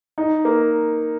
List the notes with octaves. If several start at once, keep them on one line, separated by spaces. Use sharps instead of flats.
D#4
A#3